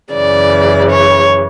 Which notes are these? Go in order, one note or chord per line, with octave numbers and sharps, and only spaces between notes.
F#2 C#3 E3 D5
C#5